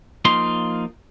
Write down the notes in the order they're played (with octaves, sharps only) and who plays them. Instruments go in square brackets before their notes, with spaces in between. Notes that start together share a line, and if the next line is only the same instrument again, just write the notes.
[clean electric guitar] F3 A#3 D#4 F4 C6